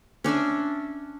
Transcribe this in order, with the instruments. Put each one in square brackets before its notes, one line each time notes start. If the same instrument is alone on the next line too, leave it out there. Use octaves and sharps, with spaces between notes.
[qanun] C#4 D4 D5 E5